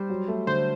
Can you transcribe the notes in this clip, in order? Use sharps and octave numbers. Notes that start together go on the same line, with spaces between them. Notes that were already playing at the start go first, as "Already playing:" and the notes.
Already playing: G3 C5
F#3
A3
D3 C5